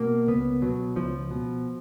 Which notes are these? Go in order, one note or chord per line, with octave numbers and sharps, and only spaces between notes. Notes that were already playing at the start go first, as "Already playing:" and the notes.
Already playing: B2 A#3
C#2 B3
B2 F#3
C#2 F3
B2